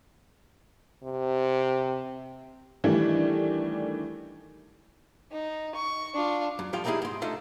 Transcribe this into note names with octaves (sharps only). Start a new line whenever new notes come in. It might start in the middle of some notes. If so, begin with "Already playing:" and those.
C3
D#3 E3 G3 A3 D4
D#4
C#6
D4 F4
F#2
A2 F3 G3 F4 A4 G5
G3 D#4 E4 G4 G#4
G#2 C6
A3 D4 D#4 F4 A4